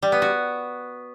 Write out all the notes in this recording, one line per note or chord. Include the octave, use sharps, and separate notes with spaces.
G3
B3
F#4